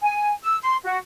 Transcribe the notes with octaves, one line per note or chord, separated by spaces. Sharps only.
G#5
E6
C6
F#4